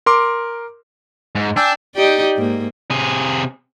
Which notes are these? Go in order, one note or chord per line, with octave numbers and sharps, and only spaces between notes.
A#4 C6 D6
G#2
D4 G5 G#5 E6
D#4 G4 D5
G#2 A#3
C3 G#4